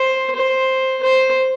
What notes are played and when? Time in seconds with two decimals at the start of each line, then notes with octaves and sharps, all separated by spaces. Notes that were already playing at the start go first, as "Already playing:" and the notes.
Already playing: C5
0.36 C5
1.03 C5